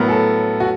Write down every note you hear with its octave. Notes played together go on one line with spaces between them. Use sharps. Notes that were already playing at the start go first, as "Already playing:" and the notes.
Already playing: A2 F#3 B3 A#4
A4
F#4